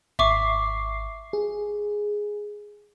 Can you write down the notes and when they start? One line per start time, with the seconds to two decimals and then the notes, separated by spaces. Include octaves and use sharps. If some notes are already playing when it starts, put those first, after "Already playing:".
0.19 G#1 E5 C#6 D6 C7
1.33 G#4